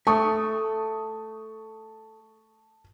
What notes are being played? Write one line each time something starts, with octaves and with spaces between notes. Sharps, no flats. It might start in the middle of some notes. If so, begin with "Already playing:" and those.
A3 A5 C#6 D#6